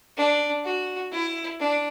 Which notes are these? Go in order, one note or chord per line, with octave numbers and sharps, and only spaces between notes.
D4
F#4
E4
D4